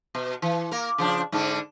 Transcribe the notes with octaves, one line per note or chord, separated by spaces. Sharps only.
B2
E3
A#3 A#4
C#3 F3 D4
G#2 D3 D4